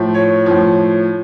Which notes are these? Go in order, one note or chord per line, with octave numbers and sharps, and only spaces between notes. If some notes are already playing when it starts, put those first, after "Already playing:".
Already playing: A2 F3
C#5
A2 F3